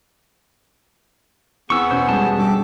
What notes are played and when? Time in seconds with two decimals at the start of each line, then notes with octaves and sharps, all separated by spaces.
1.70 E2 B3 C4 G#4 C#6 E6
1.91 B2 C#4 F#4 C5
2.09 G3 G#3 A5
2.39 G2 G4 A4 D6